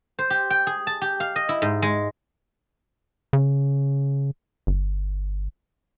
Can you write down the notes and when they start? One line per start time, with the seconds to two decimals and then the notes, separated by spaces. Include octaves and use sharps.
0.19 C5
0.30 G4
0.50 G5
0.67 G#4
0.87 A5
1.02 G4
1.20 F5
1.36 D#5
1.49 E4
1.62 G#2
1.82 G#3
3.33 C#3
4.67 G1